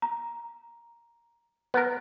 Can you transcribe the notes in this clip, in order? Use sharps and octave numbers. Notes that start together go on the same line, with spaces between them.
A#5
B3 A#4